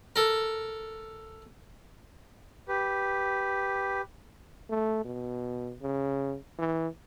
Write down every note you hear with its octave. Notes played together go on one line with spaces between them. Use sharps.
A4 A#4
G4 B4
A3
B2
C#3
E3